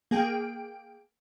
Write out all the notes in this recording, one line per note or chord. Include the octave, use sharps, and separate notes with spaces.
A#3 G#4 G5 D7